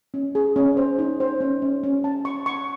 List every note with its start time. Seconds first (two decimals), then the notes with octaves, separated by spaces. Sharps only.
0.14 C#4
0.35 G#4
0.56 C#4
0.77 C5
0.99 D#4
1.20 C5
1.41 C#4
1.62 C#4
1.83 C#4
2.04 A5
2.25 C#6
2.46 C#6